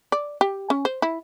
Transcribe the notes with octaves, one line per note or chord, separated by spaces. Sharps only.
D5
G4
C#4
C5
E4